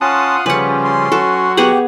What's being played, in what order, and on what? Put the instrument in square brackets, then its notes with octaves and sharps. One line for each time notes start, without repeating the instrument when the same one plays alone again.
[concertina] C#4 A5 [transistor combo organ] F4 F#5 D#6 [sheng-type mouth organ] C6
[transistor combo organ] C#3 F3 G3 [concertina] C#4 [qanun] B4 F#5
[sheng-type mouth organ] C6
[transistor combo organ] F#3 F#4 [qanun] A4
[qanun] B3 G#4 F#5 [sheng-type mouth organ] G4